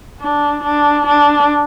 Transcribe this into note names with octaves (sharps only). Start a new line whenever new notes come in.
D4
D4
D4